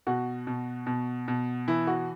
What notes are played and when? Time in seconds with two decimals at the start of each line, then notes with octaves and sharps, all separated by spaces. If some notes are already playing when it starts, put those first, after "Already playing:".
0.07 B2 F#4
0.47 B2
0.86 B2
1.28 B2
1.68 E3 E4
1.87 F#4